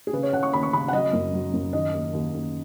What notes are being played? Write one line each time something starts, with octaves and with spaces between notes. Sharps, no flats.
G#4
C#3 B4
C#5
C#3 F#5
C#6
D#2 B5
C#6
C#3 B5
F#5
F#3 D#5
F#2
F#3
F#2
D#3 D#5
D#2
D#2
D#2